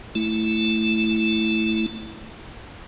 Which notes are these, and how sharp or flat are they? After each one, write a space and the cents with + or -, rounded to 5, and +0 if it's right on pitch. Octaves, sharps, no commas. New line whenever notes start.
A3 +0 E4 +0